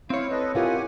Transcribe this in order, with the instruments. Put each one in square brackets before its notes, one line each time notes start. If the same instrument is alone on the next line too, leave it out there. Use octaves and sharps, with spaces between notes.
[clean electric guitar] C4 C#5 [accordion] E4 F5
[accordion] A4 B4 D#5
[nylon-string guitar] E4 F4 A#4 [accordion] G4 F#5 G#5